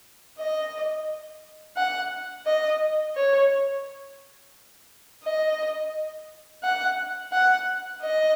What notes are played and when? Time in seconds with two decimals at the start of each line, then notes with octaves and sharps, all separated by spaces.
0.38 D#5
1.77 F#5
2.46 D#5
3.16 C#5
5.24 D#5
6.63 F#5
7.32 F#5
8.02 D#5